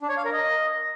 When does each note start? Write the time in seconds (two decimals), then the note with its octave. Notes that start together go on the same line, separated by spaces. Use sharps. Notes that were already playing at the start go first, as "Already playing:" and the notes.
0.01 D4
0.09 C#5
0.17 F5
0.25 A#4
0.33 D#5